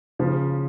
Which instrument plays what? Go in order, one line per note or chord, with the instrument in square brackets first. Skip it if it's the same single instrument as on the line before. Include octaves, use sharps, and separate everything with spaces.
[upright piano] C#3 F3